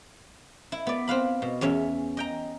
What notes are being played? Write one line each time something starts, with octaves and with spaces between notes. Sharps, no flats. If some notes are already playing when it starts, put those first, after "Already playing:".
E4
B3 D5
C4 B4 F5 B5
B2
E2 C#4 C#5 E5
D#5 G5 A#5